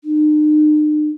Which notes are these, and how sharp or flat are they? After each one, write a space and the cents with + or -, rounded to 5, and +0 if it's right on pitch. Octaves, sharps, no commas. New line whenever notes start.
D#4 -45